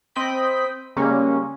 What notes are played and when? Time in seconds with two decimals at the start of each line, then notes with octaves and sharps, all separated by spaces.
0.15 C4 D#5 G5 B5 B6
0.96 C#3 G3 G#3 A#3 C#4